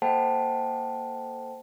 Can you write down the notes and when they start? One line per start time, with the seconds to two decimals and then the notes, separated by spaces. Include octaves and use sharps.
0.02 A#3 A4 C5 F#5 G5 A5